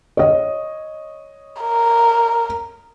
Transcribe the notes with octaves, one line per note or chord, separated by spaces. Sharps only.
C#5 D#5
A#4